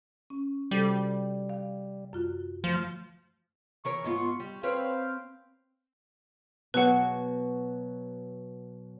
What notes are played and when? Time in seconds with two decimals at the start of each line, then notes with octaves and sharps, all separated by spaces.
0.30 C#4
0.71 C3 G3 F#4 A4
1.49 F5
2.13 F#2 F4 F#4
2.64 F3 A3
3.85 E3 A#4 C#5 C#6
4.04 G#2 B3 F4
4.40 G3
4.63 C4 B4 C#5 F5
6.74 B2 F#3 F#4 B4 F#5